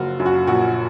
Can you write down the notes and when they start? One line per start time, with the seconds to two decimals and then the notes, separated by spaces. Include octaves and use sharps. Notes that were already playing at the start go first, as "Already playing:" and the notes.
Already playing: F#1 F3 F4 F#4
0.20 F#2
0.26 F#4
0.47 A#1 F#4